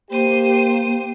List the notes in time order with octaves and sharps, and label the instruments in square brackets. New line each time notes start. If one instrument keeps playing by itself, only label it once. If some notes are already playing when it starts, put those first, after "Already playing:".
[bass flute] A#3 [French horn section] G4 [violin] C5 D#7